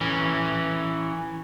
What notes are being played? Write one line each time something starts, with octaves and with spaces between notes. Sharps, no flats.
E3 C#4